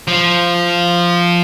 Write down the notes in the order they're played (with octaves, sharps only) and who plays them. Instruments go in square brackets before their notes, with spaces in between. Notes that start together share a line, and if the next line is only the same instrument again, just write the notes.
[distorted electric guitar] F3